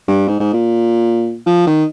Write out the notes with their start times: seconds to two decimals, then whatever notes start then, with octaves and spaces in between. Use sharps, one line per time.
0.08 G2
0.28 G#2
0.40 G#2
0.53 A#2
1.46 F3
1.67 D#3